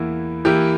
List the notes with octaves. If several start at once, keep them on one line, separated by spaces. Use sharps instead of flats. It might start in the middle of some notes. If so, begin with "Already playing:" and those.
Already playing: E2 E3 A#3 E4
E3 A#3 E4 G4 A#4